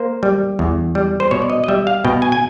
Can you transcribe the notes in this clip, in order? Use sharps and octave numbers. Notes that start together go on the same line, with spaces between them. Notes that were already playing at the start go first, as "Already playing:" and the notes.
Already playing: A#3 C5
G3
E2
G3
C5
B2 C#5
D5
D#5
D#5
G3 E5
F5
B2 G5
G#5
G#5